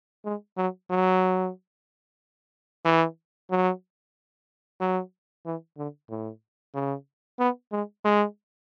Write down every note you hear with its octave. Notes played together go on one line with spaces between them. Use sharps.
G#3
F#3
F#3
E3
F#3
F#3
E3
D3
A2
C#3
B3
G#3
G#3